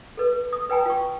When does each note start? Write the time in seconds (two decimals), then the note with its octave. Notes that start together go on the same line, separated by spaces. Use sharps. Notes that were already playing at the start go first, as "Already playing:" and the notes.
0.17 A4 B4
0.53 D#6
0.70 B4 G5 G#5 A#5
0.86 F4 G5 C#6